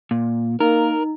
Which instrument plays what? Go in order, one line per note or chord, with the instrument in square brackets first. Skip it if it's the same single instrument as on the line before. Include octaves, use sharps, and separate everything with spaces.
[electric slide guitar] A#2
[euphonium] A#3 [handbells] D#4 [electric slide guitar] A#4